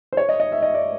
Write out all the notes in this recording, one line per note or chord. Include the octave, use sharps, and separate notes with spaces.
C5
C#5
D#5
D#5
E5
D#5
D5